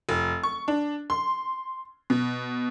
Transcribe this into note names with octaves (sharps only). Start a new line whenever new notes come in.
F1
C#6
D4
C6
B2